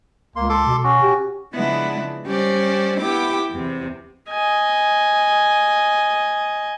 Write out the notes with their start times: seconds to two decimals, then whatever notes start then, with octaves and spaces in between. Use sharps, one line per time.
0.36 C#2 A#3 C6
0.49 A4 C6 D6
0.66 B2
0.84 C#4 F#4
1.02 G4
1.54 C#3 F3 G#3 B3 D4 E4
2.26 G3 C#4 G4 C5 D5
2.99 B3 E4 G4 G5 D6
3.52 E2 C3
4.30 D#5 G#5